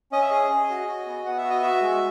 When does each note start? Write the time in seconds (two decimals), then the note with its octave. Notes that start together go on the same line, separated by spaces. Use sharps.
0.12 C#4 D#5
0.21 E5
0.30 G#4 D#5
0.50 G#4
0.70 F#4
0.88 F#4
1.07 B3
1.25 B3 F#5
1.37 E5
1.44 F#4
1.50 D#5
1.62 F#4 E5
1.82 G#3